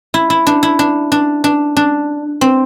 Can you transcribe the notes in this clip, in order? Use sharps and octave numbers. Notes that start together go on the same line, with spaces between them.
E4
E4
D4
E4
D4
D4
D4
D4
C4